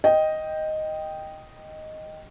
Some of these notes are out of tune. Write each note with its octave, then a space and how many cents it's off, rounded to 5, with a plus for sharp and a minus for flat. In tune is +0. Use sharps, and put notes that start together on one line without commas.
D#5 +0 G5 +0